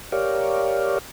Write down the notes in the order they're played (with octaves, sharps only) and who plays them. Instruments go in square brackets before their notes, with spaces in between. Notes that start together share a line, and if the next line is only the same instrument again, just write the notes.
[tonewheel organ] G4 A#4 C#5 D5 F5